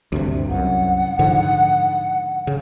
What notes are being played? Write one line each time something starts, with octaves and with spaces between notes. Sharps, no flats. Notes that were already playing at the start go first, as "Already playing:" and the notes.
D2 G2 C3
C2 F#2 F#5
G#2 D3 F3
C#3